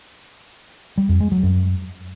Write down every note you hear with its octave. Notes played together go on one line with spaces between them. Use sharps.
G3
F2
G#3
F#3
F#2